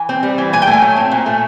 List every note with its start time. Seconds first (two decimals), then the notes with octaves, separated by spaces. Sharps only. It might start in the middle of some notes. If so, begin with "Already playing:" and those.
Already playing: E3 G#5
0.09 C4
0.23 G3
0.38 E3
0.53 A#2 G#5
0.62 G5
0.67 A3 G#5
0.82 F#3
0.96 C4
1.11 A#2
1.26 A3